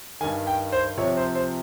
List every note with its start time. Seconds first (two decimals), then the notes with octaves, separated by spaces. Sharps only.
0.21 D#3 G#5
0.24 G2
0.47 G5
0.72 C5
0.97 C2 C3 F3 C#5
1.17 C5
1.35 C5